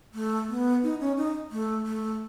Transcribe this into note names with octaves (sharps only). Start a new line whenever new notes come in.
A3
B3
D#4
C#4
D#4
A3
A3